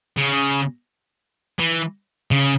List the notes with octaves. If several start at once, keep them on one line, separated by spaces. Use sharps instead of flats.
C#3
E3
C#3